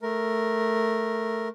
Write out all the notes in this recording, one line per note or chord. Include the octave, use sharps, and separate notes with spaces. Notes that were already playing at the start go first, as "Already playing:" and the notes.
A3 A#4